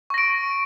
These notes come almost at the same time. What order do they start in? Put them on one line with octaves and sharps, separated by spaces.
C#6 A#6 D7